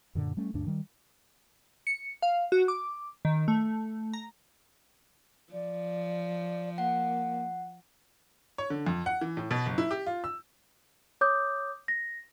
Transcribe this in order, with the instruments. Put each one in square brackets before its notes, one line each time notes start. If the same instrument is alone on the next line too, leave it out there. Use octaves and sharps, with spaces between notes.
[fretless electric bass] F#2 A#2 D3
G3 A3 C#4
D2 G2 D4
D#3 G3
[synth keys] C#7
F5
F#4
D6
D#3
A3
A#5
[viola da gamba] F3 [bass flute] D5
[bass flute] A#3 [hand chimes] F#5
[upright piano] C#5
D3
F2
F#5
E3
A2
B2
F#1
E4
G4
F4
E6
[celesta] C#5 D6 D#6 G6
A#6